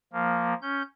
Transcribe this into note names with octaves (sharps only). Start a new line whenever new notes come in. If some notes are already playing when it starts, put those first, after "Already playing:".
F3 A#3
C#4 G6